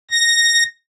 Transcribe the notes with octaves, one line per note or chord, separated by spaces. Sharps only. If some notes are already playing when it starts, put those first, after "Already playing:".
A#6